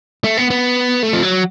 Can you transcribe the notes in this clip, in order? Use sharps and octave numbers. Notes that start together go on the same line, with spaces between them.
A3
B3
B3
A3
F3
F#3